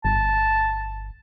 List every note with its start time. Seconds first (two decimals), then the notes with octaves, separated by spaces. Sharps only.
0.05 G1 A5